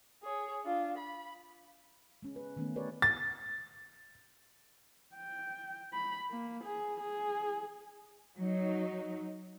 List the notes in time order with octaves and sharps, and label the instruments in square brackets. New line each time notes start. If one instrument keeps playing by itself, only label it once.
[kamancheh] G#4 C#5
D4 F4
B5
[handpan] G#3 C#4
B4
D#3 E3 A3 B3 C#4
G4 A#4 B4 C#5 D5
[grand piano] A6
[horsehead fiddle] G5
B5
A#3
G#4
G#4
[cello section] F#3 D#4